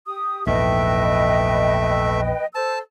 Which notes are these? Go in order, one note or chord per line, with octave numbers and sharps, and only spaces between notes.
G4 D#6
A#1 E2 G#2 A3 B4 D#5 E5 G5
A4 C5 A5 E6